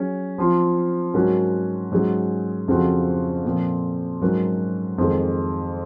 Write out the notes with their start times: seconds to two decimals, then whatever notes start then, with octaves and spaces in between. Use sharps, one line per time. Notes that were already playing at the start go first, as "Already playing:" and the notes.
Already playing: F#3 C#4 G#4
0.38 F3 C4 F4
1.14 G#2 F#3 C#4 F#4 A#4
1.91 G#2 F#3 C#4 G#4
2.68 F2 C#3 F3 C4 F#4
3.45 A#2 F3 C4 F4
4.21 G#2 F#3 C#4 F#4 A#4
4.98 F2 D#3 G#3